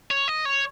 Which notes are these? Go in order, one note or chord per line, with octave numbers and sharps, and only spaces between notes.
C#5
D#5
C#5